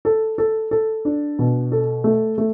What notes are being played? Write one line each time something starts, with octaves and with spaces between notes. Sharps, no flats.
A4
A4
A4
D4
B2
A4
A3
A3